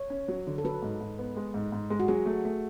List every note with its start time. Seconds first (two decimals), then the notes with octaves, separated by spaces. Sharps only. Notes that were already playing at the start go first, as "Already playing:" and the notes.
Already playing: C#5
0.10 C#4
0.28 F#3
0.47 D3
0.58 A4
0.64 F#3 B4
0.82 G#2
1.00 G#2
1.19 B3
1.36 G#3
1.54 G#2
1.72 G#2
1.90 G#3
2.00 F#4
2.08 F#3 G#4
2.26 A3
2.45 A3